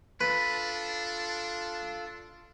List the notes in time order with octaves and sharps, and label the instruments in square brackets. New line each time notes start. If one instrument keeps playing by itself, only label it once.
[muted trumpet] D4 [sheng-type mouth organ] F4 A4 [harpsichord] B4